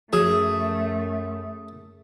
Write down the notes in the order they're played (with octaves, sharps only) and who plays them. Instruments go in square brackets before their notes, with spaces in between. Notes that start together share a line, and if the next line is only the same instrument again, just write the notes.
[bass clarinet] F#2 [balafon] F3 F#4 [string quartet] A3 [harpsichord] G#4